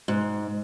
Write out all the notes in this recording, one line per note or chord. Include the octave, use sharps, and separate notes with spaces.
G#2